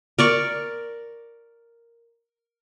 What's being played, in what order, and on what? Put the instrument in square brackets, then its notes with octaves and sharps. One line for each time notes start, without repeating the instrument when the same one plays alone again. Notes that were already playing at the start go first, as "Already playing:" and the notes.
[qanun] A#4 D5 C#6